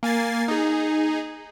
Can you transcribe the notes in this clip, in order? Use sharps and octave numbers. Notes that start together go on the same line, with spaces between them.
A#3 G#5 A6 C7
D#4 G#4